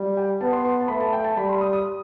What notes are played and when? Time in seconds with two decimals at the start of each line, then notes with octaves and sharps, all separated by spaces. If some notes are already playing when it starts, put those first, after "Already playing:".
Already playing: G3
0.17 G5
0.41 B3 A5
0.53 C6
0.65 C6
0.80 A5
0.88 A3 B5
1.00 A5
1.13 G5
1.24 A5
1.37 G3 B5
1.49 C6
1.61 D#6
1.73 D#6